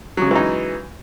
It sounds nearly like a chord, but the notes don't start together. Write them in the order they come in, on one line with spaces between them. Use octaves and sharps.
F#3 C#3 G#3 E3 D#4